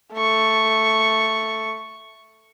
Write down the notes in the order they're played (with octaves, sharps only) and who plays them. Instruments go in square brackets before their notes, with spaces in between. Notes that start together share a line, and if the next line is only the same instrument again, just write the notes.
[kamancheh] A3 C#6